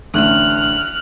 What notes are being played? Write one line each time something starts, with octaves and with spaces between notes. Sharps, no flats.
A1 D3 A3 F6 F#6